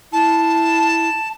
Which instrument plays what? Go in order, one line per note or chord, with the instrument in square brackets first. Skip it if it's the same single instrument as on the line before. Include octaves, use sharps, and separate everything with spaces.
[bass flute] E4 [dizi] A5